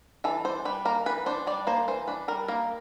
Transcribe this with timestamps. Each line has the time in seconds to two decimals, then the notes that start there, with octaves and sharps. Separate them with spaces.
0.24 E3 A4
0.45 D4 C5
0.65 G3 B4
0.85 A#3 A#4
1.06 E3 B4
1.26 D4 C5
1.47 G3 D5
1.67 A#3 C5
1.88 E3 C5
2.08 D4 B4
2.28 G3 A#4
2.48 A#3 A#4